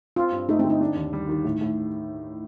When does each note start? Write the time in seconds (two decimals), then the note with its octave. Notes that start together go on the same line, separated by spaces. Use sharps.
0.16 C4 F4
0.32 G2
0.49 A3 D#4
0.59 C4
0.64 D3
0.70 D#4
0.81 D4
0.96 D#2
1.13 G3
1.29 D#3
1.44 A2
1.61 A2